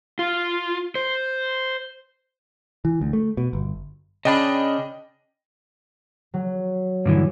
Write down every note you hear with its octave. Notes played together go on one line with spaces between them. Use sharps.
F4
C5
E3
D2
A3
B2
G1
C#3 D4 D#5 G5 B5
F#3
G2 D3 E3